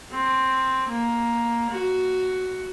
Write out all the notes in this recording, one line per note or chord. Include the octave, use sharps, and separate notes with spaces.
C4
A#3
F#4